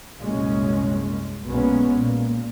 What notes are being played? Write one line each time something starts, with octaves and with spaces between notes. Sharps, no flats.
C2 F#2 A#2 G#3 C#4
B1 A#2 F#3 G#3 B3 C#4
A#2